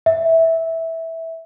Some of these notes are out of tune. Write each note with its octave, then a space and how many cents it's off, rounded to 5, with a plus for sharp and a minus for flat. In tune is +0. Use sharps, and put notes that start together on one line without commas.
E5 -10